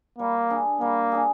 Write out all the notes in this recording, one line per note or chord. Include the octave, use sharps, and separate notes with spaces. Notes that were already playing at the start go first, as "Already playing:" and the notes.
G3 A#3
D4 G#4
G3 A#3
D4 G#4